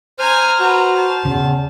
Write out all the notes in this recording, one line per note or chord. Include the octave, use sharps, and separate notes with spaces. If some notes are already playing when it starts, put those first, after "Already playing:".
C5 G#5 A#5 F6
F#4 B4 A#5
A5
E2 C#3